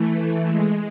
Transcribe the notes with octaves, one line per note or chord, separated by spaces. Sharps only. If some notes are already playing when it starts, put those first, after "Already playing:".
Already playing: E3 A3
G#3